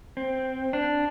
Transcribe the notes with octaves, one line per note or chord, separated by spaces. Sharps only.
C4
D4